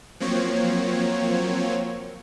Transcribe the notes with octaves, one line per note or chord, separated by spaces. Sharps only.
F3 F#3 A#3 C4 C#5